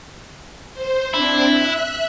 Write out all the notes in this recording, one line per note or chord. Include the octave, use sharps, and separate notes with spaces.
C5
C4 D4 E4
E5 F#6